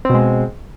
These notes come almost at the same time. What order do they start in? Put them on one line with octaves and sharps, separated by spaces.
C4 B2 G#3